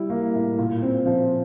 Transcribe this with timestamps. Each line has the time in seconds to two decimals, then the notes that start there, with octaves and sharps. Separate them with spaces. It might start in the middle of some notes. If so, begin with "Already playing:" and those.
Already playing: G3 E4
0.10 A#3
0.34 A2
0.59 A#2
0.82 C4
1.06 F3